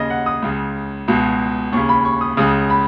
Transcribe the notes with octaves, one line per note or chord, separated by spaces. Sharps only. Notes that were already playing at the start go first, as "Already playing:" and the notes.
Already playing: D#2 C#3 D#5
F#5
D#6
C#2 C#3
C#2 B2
D#2 C#3 C#6
B5
C#6
D#6
C#2 C#3 D#6
B5